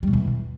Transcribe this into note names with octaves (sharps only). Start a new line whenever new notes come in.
G3
B2
E2